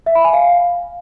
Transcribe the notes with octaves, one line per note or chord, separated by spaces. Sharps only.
E5
B5
G#5
F5